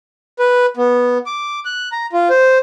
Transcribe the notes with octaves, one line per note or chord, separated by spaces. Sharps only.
B4
B3
D6
F#6
A#5
F4
C5